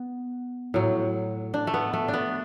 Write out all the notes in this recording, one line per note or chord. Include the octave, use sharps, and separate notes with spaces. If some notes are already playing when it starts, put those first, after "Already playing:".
Already playing: B3
A2 F#3
D4
A3
B3
A3
D4
B3